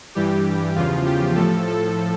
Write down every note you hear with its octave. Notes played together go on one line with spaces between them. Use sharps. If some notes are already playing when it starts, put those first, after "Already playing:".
G2 E3 G3 G4
E2 C#3 F3 F4
G4
A2 F3 A4
A4